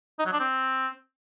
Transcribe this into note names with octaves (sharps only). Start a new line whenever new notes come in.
D#4
F#3
D4
C4